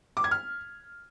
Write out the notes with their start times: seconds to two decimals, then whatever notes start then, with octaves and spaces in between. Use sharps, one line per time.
0.17 D6
0.24 G#6
0.31 F6